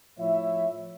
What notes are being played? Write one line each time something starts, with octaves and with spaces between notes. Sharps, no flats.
A2 F3 E4 C#5 E5